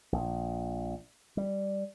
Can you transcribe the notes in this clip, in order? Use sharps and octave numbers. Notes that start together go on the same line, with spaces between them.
A#1
G3